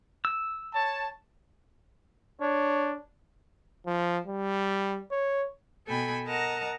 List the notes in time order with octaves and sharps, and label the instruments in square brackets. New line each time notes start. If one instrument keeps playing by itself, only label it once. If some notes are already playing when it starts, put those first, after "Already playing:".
[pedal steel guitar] E6
[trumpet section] C#5 A5
[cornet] D4 [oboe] C#5
[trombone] F3
G3
C#5
[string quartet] B2 A4 G5 G#5 B5
A#4 D#5 F#5 A5 A#5